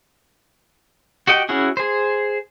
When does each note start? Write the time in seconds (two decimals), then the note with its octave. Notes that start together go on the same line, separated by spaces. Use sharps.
1.27 F#4 G4 D#5 G5
1.49 C#4 E4 F#4 G#4
1.77 G#4 C5